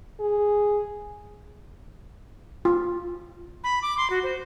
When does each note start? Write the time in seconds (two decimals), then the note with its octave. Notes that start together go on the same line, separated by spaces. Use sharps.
0.20 G#4
2.65 F4
3.64 B5
3.82 D6
3.97 C6
4.10 F#4
4.23 C5